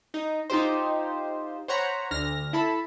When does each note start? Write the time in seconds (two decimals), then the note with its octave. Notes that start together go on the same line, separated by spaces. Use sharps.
0.14 D#4
0.50 D#4 F4 G4 C5
1.68 C5 C#5 F#5 A#5 B5
2.11 D2 D3 F6 A#6
2.53 E4 A4 A5 B5